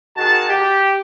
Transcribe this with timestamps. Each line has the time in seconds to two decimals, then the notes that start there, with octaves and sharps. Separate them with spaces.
0.17 D#3 F#4 G#4 A5
0.48 G4